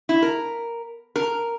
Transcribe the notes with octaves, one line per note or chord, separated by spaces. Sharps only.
E4
A#4
A#4